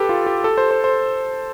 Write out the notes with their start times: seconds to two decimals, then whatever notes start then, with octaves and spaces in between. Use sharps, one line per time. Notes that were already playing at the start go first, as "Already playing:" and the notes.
Already playing: G4 A4 B4
0.09 F4
0.26 G4
0.44 A4
0.58 C5
0.71 C5
0.84 C5